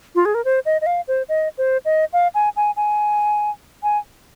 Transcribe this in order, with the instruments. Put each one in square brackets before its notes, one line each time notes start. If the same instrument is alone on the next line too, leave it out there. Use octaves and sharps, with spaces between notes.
[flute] F4
G#4
A#4
C5
D#5
D#5
F5
C5
D#5
C5
D#5
F5
G#5
G#5
G#5
G#5